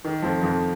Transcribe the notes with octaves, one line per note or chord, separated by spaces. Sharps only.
D#3
F2 F3
F2 F3